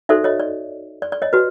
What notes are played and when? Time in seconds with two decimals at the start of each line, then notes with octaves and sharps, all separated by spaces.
0.09 D#4 F#4 A4 C5 D5 E5
0.24 C#5 D#5
0.40 D5
1.02 D5
1.12 D5
1.22 C#5 D#5
1.33 F#4 B4